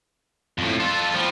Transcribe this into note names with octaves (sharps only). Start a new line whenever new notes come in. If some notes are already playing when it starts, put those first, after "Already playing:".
F2 A2
F4 A4
F3 G3